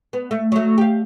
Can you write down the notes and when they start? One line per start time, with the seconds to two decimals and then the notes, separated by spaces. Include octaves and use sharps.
0.13 B3
0.31 A3
0.52 F#3 A3
0.78 G4 F5